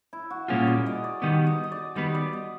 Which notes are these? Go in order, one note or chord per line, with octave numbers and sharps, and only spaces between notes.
E4
F#4
A#2 G3 A#3 C#4 F4 G#4
D5
D#5
D5
D#3 G3 B3 D#5
D#5
D#5
D5
D#3 G3 B3 D#5
D5
D#5